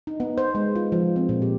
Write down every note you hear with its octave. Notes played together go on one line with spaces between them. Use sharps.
D#4
B3
C5
G#3
F4
F3
C4
A#2
G4